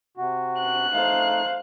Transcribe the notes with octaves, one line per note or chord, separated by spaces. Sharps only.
C3 F#4
F#6
A3 D#4 C5 F5